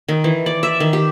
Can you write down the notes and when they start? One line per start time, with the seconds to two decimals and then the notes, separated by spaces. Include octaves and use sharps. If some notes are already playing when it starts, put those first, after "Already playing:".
0.09 D#3
0.24 E3
0.46 D5
0.63 E5
0.80 D#3
0.93 G4